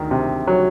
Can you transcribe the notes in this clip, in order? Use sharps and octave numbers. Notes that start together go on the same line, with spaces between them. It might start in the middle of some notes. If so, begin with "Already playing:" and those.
Already playing: D2 D#3
C3
F#3